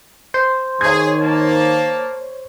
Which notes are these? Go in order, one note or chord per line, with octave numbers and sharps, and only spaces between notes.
C5
D#3 G#4 C#5 G#6
A#3 A5